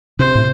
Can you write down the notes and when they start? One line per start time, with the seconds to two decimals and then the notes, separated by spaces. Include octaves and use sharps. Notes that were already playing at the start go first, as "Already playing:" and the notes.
0.19 C3 C5
0.35 A2